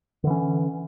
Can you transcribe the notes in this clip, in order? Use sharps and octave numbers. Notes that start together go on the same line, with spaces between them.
D3 E3 C#4